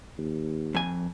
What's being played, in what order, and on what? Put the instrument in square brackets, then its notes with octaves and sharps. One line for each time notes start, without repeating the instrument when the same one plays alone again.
[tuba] D#2
[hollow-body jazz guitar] F2 G#5